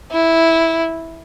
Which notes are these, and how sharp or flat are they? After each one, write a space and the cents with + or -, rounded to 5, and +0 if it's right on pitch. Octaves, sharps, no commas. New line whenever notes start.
E4 -5